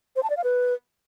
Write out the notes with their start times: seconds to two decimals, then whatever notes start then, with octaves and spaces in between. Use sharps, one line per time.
0.16 C5
0.23 A5
0.30 D5
0.37 F5
0.44 B4